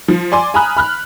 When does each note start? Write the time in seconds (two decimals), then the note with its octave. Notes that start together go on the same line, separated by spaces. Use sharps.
0.08 F3
0.32 D5 G#5 C6 D6
0.54 G#5 A#5 B5 D#6 F6 F#6
0.77 B5 F6 F#6